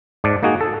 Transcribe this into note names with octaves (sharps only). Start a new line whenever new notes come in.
G#2 D5 A5
A#3 D#4 F#4 G#4
A4